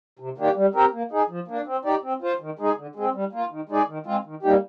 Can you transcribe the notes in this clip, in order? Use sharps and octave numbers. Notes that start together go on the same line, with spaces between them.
C3
D#3 A#3 D4 G4
G3
C4 G4 A#4
A#3
D#4 G#4
F3
A#3 D4
C4
D#4 G4 D5
C4
F4 C5
D#3
G#3 D#4 G#4
D3
G#3 C4
G3
A#3 F4
D#3
G#3 D#4 G#4 D5
D#3
G#3 C4 F4
D#3
G3 A#3 D#4 G4